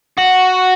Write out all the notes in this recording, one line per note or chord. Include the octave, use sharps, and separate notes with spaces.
F#4